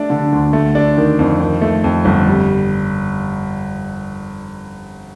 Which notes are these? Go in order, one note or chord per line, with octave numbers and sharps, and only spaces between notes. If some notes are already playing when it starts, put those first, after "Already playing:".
Already playing: A3 D4
D3
D2
A3
D4
D#3
F2
D#3
A3
F2
G1
G3